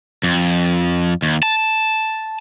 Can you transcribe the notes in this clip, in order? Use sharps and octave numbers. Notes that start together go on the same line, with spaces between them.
F2
D#2
A5